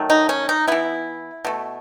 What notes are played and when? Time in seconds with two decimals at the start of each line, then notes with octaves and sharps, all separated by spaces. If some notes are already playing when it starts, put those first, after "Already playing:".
Already playing: D#3 F#3 A3
0.10 D#4
0.29 C#4
0.49 D#4
0.67 E3 B3 E4
1.45 B2 A3